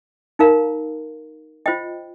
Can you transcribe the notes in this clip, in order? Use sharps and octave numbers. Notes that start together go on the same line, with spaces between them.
D#4 A#4 F5 A#5
F4 C5 D#5 G5